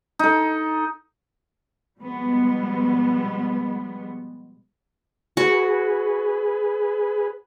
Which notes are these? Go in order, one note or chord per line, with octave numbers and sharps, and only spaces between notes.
D#4 A4
B2 F3 G3 G#3 B3
F#4 G#4 B4